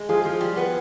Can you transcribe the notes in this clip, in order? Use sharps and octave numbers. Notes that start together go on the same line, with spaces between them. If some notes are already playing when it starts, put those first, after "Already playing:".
Already playing: G#3
F3 G#4
F3
G3
B3